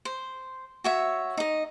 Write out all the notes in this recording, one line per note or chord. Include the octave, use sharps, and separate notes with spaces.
C5
F#4 C#5 E5
D#4 D#5